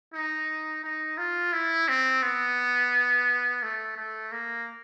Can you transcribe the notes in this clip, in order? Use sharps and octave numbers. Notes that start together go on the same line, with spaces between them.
D#4
D#4
F4
E4
C4
B3
A3
A3
A#3